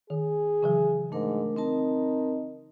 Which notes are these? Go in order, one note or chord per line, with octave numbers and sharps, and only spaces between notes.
D#3 G#4
C#3 E3 F#3
G#2 A3 D4 A#4
C4 D#4 A#4 A5